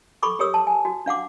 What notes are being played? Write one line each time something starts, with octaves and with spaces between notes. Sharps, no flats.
A4 B5 C#6 D6
G4 G#4 A#4 C#5 D#6 E6
A5
G#5
F#4
D4 F5 F#5 D6